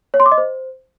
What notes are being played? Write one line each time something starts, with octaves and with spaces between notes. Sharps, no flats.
C#5
C6
D6
D#5
C5